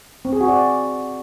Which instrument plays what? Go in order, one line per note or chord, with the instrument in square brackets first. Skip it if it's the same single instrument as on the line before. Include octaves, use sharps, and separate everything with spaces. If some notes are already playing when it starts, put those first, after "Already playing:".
[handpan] C4
G#4
F#4
D5